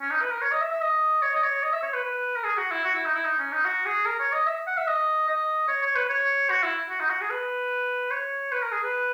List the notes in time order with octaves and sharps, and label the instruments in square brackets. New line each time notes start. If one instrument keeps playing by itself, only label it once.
[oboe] C#4
D#4
B4
A#4
C#5
D#5
E5
E5
D#5
C#5
D#5
C#5
D#5
E5
C#5
B4
B4
A#4
G#4
F#4
E4
F#4
E4
D#4
E4
D#4
C#4
D#4
F#4
G#4
A#4
C#5
D#5
E5
F#5
E5
D#5
D#5
C#5
C#5
B4
C#5
F#4
E4
F#4
D#4
F#4
G#4
B4
C#5
B4
A#4
G#4
B4